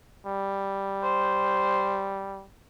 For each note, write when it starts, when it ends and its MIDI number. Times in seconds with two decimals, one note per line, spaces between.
0.26 2.45 55
1.03 2.11 72